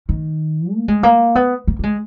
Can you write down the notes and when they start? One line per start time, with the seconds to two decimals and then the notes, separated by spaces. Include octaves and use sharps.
0.09 D#3
0.73 A#3
0.88 G#3
1.03 A#3
1.35 B3
1.67 A#3
1.79 A#3
1.83 G#3